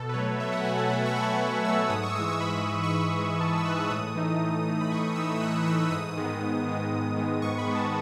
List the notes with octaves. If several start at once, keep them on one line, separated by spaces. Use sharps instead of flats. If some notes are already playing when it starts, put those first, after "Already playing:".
Already playing: B2 A4
B4
F#3 A3 C#5
B2 E5
F#5
F#3 A3 G#5
A5
B2 B5
C#6
F#3 A3 B5
A5
B2
F#3 A3 E6
G#2 D#6
C#6
E6
E3 G#3 D#6
C#6
G#2 B5
E3 G#3
C#6
G#2 B5
E3 G#3
G#2 A5
E6
E3 G#3 F#6
A2 D#6
E3 A3 D#4
A2
E3 A3 D#4
B5
A2 C#6
E3 A3 D#4 E6
E6
A2 F#6
E3 A3 D#4 E6
G#2 D#6
D#3 G#3 B3
G#2
D#3 G#3 B3
G#2
D#3 G#3 B3
G#2 C#6
B5
D#3 G#3 B3
A5